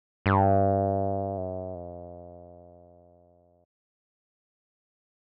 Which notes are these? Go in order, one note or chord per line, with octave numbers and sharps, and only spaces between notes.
G2
F#2
F2